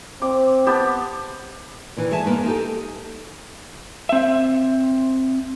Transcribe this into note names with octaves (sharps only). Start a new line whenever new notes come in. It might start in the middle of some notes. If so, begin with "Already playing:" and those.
C4 D6
B3 G4 A5
A#2 D#3 E3
G#4 D#5 E5 G#5 A5
G#3 A#3 B3 D#4
D#4 G4 A4
C4 E5